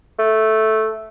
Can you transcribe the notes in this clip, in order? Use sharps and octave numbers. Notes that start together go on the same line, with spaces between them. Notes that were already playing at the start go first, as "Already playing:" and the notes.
A3